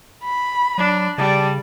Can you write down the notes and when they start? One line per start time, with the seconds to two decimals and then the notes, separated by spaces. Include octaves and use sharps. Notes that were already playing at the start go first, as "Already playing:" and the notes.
0.24 B5
0.78 F#3 D4
1.18 C#3 G3 A5